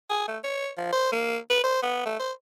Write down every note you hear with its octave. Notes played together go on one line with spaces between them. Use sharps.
G#4
A3
C#5
F3
C5
A#3
B4
C5
B3
A3
C5